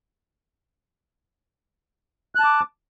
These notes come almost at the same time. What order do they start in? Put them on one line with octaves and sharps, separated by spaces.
F#6 A5 D6